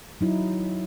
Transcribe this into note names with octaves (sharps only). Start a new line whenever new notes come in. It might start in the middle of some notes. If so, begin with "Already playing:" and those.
F#3 D#4 E4